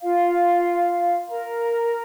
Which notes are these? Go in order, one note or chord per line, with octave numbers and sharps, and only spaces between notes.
F4 F5
A#4 A#5